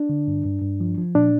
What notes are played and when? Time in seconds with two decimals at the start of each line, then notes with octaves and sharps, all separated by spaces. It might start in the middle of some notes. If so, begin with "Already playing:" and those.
Already playing: D4
0.09 D3
0.28 G2
0.45 G2
0.62 G2
0.81 F3
0.98 F3
1.15 A#2 D4